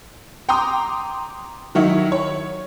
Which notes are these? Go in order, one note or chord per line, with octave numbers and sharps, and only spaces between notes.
G5 A#5 C6 D6 D#6
D#3 F#3 E4
C#5